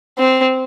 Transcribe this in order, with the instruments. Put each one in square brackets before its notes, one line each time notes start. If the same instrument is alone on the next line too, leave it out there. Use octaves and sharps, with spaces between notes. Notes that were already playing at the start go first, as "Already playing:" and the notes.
[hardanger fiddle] C4